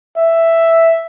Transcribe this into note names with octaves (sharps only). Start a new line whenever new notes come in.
E5